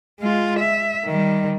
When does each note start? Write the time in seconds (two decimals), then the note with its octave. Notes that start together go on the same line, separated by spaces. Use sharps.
0.20 G#3 F4
0.59 E5
1.06 D#3 G3